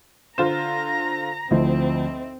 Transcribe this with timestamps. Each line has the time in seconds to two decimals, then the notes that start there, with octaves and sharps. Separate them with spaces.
0.38 D3 F4 C5 A#5 A#6 E7
1.51 D2 F3 C4 D#4 E4 C5